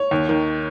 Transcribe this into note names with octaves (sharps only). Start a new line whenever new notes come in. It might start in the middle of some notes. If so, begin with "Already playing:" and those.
Already playing: C#5
D#2
D#3